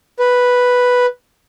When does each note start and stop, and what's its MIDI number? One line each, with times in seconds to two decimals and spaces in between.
0.19 1.06 71